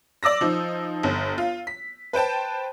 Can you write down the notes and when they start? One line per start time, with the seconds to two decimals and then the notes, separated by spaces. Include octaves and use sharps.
0.23 D5 D6 E6 A#6
0.41 F3 D#4
1.03 G1
1.38 F4
1.67 B6
2.13 B4 C5 G5 A5